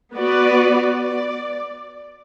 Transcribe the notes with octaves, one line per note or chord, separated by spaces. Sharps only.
B3 F#4 B4 D5
D5